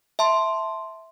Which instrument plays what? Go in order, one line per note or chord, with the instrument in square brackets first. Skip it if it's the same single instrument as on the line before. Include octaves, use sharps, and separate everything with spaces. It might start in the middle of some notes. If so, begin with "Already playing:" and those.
[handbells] E5 A5 C6